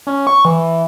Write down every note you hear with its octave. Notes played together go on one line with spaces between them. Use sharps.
C#4
C#6
E3